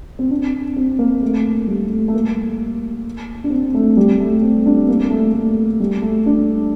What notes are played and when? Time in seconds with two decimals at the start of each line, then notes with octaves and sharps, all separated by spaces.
0.19 C4
0.31 D4
0.77 C4
0.99 A#3
1.22 A3
1.68 G3
1.90 A3
2.08 A3
2.14 A#3
3.44 D4
3.50 C4
3.74 A3
3.97 G3
4.20 A3
4.43 C4
4.66 D4
4.88 A#3
5.11 A3
5.34 A3
5.80 G3
6.02 A3
6.26 D4